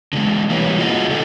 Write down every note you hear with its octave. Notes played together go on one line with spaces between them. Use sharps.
D3 E3 G3 G#3
E3 G3 A#3 E4 B4 C#5
F4 F#4 G#4 D#5 F5 F#5
D3 D#4 A4 D#5